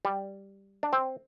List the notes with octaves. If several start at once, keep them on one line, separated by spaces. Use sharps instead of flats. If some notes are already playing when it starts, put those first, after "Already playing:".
G3
D4
C4